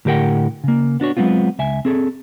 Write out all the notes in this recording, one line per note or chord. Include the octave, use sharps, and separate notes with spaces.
A2 D3 G4 A#4 F#5 G5
C#3 A#3
B3 D4 F#4 C#5
F#3 G#3 B3 C4 F4
C#2 E5 G#5
C4 G#4 A4